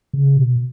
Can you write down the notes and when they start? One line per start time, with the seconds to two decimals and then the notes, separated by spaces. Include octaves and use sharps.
0.13 C#3
0.37 B2